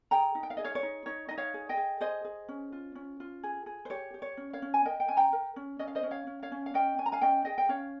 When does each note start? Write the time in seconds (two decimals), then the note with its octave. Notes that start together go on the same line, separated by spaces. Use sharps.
0.11 G#4 G5 A#5
0.35 D#4
0.43 G5
0.50 F5
0.57 G#4 D#5
0.64 C#5 F5
0.75 C#5
0.83 D#4
1.06 D#4 C#5
1.29 D#4 D#5
1.38 C#5 F5
1.54 G#4
1.69 D#5 G5
1.77 G#4
2.01 G#4 C5 D#5
2.25 G#4
2.48 C#4
2.72 F4
2.95 C#4
3.20 F4
3.43 G#4
3.66 G#4
3.85 C5
3.90 G4 C#5
4.14 G4
4.22 C#5
4.37 C#4
4.53 C#5 F5
4.62 C#4
4.74 G#5
4.85 A#4 D#5 G5
5.00 G5
5.08 C#4 G#5
5.17 G5 A#5
5.33 A#4
5.56 C#4
5.79 C#4 D#5
5.87 F5
5.95 C5 D#5
6.03 C#4
6.11 C#5 F5
6.27 C#4
6.43 C#5 F5
6.52 C#4
6.66 F5
6.74 C#4 D#5 G5
6.98 C#4 G#5
7.06 A#5
7.12 F5 G#5
7.21 C#4 D#5 G5
7.45 G#4 D#5 G5
7.58 G5
7.69 C#4 C#5 F5